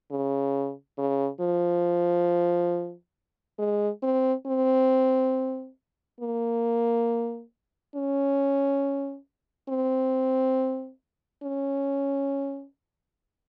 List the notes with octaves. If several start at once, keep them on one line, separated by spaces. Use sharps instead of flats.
C#3
C#3
F3
G#3
C4
C4
A#3
C#4
C4
C#4